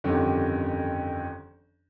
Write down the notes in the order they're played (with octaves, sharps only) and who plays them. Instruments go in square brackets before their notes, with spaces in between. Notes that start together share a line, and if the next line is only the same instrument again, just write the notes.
[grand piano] G1 F2 D3 D#3 C#4 G4